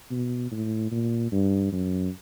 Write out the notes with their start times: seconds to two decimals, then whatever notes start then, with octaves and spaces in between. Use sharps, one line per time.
0.11 B2
0.51 A2
0.92 A#2
1.32 G2
1.72 F#2